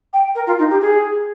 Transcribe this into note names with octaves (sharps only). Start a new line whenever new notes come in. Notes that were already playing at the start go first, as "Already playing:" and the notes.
G5
A#4
F4
D#4
G4
G#4